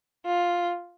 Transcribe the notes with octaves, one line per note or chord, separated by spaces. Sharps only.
F4